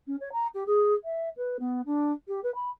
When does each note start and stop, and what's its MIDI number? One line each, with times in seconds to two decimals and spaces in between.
0.07 0.16 61
0.20 0.32 73
0.32 0.47 82
0.54 0.64 67
0.66 0.93 68
1.04 1.29 76
1.37 1.57 71
1.59 1.81 59
1.85 2.12 62
2.27 2.40 67
2.43 2.53 71
2.55 2.70 83